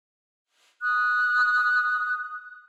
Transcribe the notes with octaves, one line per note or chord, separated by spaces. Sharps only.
D#6 F#6